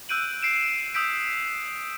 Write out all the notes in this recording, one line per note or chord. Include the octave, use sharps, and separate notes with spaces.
E6 F#6 G6 D7 D#7 F#7
C7 D7 E7
D#6 E6 G6 B6 D7